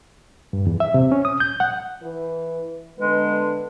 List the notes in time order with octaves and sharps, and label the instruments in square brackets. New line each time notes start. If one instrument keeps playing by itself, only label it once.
[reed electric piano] G2
E2
E5
C3
C#4
D#6
G6
F#5
[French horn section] E3 B4
[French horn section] D3 B3 B4 [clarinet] G#3